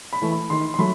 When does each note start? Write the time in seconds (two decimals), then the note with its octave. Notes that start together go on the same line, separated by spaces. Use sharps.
0.13 B5
0.22 E3 A3
0.31 B5
0.50 D#3 C6
0.74 C6
0.79 F#3 A3 B5